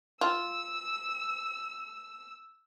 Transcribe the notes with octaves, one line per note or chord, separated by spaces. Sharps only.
F4 E6